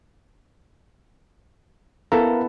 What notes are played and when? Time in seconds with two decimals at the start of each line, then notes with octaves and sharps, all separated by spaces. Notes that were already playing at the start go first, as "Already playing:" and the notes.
2.12 B3 E4 A4 A#4 F5 A#5